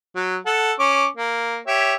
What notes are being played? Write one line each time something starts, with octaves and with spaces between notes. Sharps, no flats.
F#3
A4 F#5
C#4 C#6 D6
A#3
G4 C#5 E5